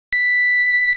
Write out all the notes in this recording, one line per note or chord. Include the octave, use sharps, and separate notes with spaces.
B6